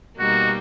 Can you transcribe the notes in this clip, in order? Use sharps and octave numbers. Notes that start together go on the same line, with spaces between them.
B2 G3 A#3 D#4 F#4